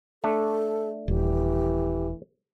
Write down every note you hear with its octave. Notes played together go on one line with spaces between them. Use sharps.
A3 D4 A4
D#1 E3 G4